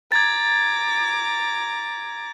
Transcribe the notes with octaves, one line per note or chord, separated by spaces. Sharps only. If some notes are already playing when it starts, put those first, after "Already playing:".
A#5 D6 G#6 A6